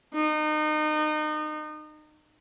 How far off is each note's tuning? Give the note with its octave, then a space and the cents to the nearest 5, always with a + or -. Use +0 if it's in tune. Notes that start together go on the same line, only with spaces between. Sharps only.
D#4 -30